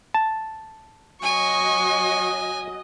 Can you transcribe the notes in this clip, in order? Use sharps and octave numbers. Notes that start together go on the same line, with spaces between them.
A5
F#3 D#5 G#5 C#6